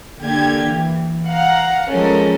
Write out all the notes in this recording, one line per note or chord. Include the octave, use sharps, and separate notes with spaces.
D3 A#3 G4 G#6
E3
F5 F#5 A#5
F3 G#3 C#4 A4 A#4